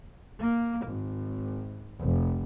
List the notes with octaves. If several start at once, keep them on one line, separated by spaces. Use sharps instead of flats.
A#3
G#1
F1